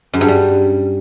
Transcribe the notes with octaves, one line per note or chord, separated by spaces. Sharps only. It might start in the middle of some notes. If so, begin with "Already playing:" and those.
F#2
G2
G3